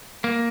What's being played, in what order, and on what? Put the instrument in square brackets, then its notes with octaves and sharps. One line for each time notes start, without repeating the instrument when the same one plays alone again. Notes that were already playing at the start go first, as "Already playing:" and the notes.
[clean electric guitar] A#3